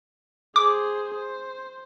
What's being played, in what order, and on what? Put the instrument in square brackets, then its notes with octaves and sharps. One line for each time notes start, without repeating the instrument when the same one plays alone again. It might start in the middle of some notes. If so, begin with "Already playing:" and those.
[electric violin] G#4 C5 [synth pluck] D6
[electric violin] C5